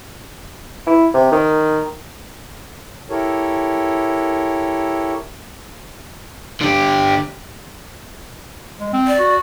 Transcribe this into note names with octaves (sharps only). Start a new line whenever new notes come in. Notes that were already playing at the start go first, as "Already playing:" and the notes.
E4
C3
D#3
E4 G4 A4 A#4 C#5
D3 G4
G#3
C4
D5
F#4